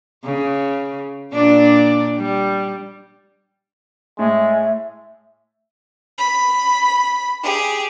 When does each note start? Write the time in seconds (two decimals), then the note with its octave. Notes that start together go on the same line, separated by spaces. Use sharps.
0.24 C#3
1.32 A#2 D4 D5
2.18 G3
4.19 A2 G#3 E5
6.19 B5
7.43 G4 G#4